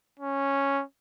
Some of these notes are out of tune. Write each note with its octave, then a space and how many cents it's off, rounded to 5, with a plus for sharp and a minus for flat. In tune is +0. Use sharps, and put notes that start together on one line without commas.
C#4 -5